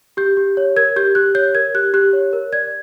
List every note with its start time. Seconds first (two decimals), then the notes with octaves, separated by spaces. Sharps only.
0.17 G4 G6
0.37 G4
0.57 C#5
0.76 A#4 G#6
0.96 G4 G6
1.15 G4 F#6
1.35 C#5 G6
1.55 A#4 G#6
1.74 G4 F#6
1.94 G4 F#6
2.13 C#5
2.33 A#4
2.52 D5 G#6